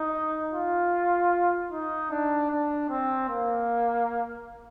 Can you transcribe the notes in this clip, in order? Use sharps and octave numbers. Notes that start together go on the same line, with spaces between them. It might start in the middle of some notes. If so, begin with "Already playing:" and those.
Already playing: D#4
F4
D#4
D4
D4
C4
A#3